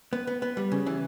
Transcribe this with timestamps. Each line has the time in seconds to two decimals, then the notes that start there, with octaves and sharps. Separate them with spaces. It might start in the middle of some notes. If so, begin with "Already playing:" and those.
0.13 B3
0.27 B3
0.42 B3
0.57 G3
0.72 C#3
0.86 E3